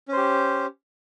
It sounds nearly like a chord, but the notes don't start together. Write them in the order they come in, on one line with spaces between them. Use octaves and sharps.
C#4 C5 G4